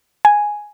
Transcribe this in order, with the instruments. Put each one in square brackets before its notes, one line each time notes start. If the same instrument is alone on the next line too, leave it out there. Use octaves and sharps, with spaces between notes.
[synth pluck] G#5